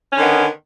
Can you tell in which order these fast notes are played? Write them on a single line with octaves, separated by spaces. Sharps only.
C#4 D3 D#3 B3